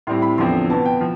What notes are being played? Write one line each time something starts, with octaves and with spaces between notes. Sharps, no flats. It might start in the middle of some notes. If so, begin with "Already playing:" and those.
A2 G3 C4 C6
B5
E2 D3 F3 C4 C6
B2 B3 A5
G5
F3